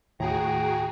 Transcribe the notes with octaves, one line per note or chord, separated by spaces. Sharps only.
D#2 A2 F#4 G#4 G5 A#5